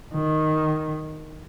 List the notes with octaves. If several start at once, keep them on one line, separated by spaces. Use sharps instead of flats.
D#3